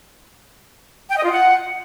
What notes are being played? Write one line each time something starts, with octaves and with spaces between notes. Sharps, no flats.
G5
D#5
F4
F#5